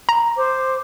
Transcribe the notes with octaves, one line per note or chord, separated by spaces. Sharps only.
A#5
C5 D6